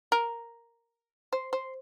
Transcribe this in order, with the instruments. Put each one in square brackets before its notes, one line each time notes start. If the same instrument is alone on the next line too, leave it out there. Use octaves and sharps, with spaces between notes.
[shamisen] A#4
C5
C5